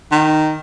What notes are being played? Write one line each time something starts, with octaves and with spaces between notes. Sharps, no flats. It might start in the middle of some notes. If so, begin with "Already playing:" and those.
D#3